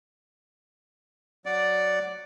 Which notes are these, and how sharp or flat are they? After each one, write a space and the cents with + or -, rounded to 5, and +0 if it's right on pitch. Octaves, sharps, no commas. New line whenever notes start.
F#3 +0 D5 +0 F#5 +0